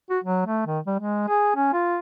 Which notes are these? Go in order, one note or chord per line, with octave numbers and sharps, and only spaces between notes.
F#4
F#3
A3
D#3
G3
G#3
G#4
C#4
F4